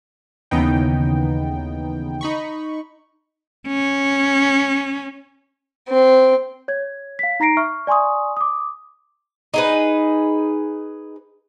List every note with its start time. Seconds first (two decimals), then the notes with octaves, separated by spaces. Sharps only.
0.51 D#2 C#3 E3 B3 D#4 G5
2.21 D#4 B5 C#6
3.68 C#4
5.90 C4
6.68 C#5 G#6
7.19 F5 B6
7.40 D#4 A#5 A#6 C7 D7
7.57 E5 C#6 F6
7.87 D5 G#5 C6 C#6 D#6
8.37 D6 D#6
9.54 D#4 G#4 B4